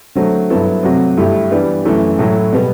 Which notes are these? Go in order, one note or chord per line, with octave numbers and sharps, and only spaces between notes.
D3 F#3 A3 C4 F#4
G2 F#3 B3 E4 A4
C3 F#3 A3 C4 F#4
G2 D3 A3 E4 G4
E3 G3 B3 D4
F#2 E3 A3 E4
A2 F#3 A3 E4 A4
B2 G3 B3